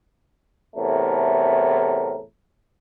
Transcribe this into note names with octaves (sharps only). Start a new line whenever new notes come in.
E2 A2 C3 A3 A#4